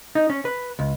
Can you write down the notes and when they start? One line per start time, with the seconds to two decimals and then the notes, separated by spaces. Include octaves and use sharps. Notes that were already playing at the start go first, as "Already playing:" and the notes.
0.15 D#4
0.30 C#4
0.45 B4
0.79 C#2